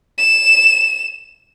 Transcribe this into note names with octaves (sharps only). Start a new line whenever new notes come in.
E7